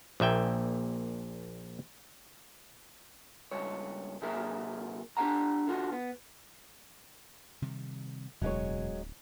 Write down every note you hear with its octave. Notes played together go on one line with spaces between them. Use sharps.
A#1 A#2 E5 G5
C#2 G2 C#5
C3 F#3 A#3 G#4 A#4 E5
D4 G4 B4 F5 F#5 A#5
D3 F4 F#4
B3
C3 D#3 G3
D1 E2 B2 F#3 G#3 C#5